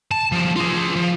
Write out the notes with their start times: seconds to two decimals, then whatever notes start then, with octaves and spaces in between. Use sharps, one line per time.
0.11 A5
0.32 F3 G3
0.56 F4 G#4
0.96 F3